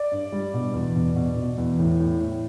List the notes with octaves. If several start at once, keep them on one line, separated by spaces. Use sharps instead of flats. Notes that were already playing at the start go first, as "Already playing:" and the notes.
Already playing: D5
G2
G3
B2
E2
B2
B2
B2
E2
A2
A2
A2